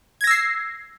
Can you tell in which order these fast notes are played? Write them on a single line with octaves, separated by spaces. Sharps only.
G#6 A#6 E6 C7